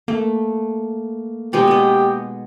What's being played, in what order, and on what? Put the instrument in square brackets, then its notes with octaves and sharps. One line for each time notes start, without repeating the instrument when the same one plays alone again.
[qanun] A3 [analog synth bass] A#3
[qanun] B2 G#3 D#4 [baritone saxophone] G4
[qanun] B3 D#5